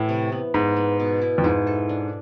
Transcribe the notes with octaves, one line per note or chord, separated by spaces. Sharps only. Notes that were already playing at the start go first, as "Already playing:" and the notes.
Already playing: A2 E3 E4
C3
B3
G#2 B3
B3
B2
E4
F2
G#2 E4
A4
D4